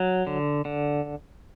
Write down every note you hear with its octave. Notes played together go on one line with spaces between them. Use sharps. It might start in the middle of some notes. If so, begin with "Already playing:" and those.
Already playing: F#3
D3
D3